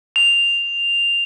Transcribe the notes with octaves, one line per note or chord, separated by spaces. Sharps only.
F7